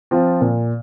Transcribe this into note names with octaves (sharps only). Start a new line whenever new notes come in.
F3 C4 F4
A#2